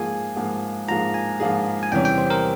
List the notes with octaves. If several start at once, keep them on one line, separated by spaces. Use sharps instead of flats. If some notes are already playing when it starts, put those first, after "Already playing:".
Already playing: G#2 F3 A#3 F4 G#4 G#5
G#2 F3 A#3 F4 G#4
G#2 F3 A#3 F4 G#4 A#5
G#5
G#2 F3 A#3 F4 G#4
G#5
E2 C3 E3 G3 C#4 G5
G5
C5
A#4